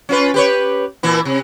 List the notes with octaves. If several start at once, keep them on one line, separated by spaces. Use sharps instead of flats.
C#4 F4 B4
G4 B4 C#5
A#2 E3 E4
C3